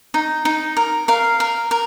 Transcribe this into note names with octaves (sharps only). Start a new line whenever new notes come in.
D#4
D#4
A#4
A#4 F5
A#4
A#4